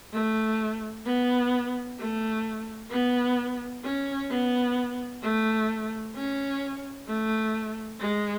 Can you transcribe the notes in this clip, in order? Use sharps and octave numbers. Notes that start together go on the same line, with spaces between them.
A3
B3
A3
B3
C#4
B3
A3
C#4
A3
G#3